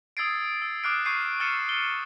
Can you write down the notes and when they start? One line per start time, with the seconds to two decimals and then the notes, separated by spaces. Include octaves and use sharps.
0.17 D#6 E6 G#6 A6 C7 D7
0.62 E6
0.84 D6 D#6 F6 F#6 C7 D7
1.05 C#6 G6 C7 D7 D#7
1.40 E6 F6 A6 C#7 D#7 E7
1.69 G7